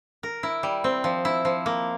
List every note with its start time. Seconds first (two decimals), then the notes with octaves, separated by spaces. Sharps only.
0.23 A#4
0.43 E4
0.63 G3
0.84 C4
1.04 F3
1.25 E4
1.45 F3
1.66 A#3